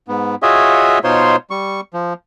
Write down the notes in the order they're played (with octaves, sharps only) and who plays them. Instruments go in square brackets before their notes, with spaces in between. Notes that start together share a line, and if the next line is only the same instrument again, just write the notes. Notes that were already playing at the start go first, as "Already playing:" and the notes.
[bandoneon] G#2 B3
F4 F#4 G#4 C#5 D#5 E5
B2 D#4 F4 C5 C#5 C6
G3 C#6
F3